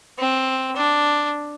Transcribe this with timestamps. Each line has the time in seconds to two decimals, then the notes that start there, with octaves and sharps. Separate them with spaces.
0.19 C4
0.76 D4